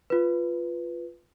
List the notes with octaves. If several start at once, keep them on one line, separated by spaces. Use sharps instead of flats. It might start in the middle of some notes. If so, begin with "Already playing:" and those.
F4 B4